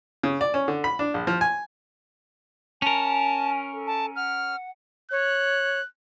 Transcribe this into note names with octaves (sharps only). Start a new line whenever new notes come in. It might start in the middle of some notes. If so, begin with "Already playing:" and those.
C#3
D5
C#4
D3
B5
D4
A#1
F3
G#5
C#4 A#4 G#5 A5
A4
A5
F#5 F6
C#5 F#6